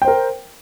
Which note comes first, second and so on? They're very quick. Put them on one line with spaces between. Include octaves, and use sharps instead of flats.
G5 C5 A#4